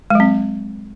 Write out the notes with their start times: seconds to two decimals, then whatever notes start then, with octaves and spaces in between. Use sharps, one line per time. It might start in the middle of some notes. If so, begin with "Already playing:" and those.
0.10 G#3
0.15 F#3
0.20 C4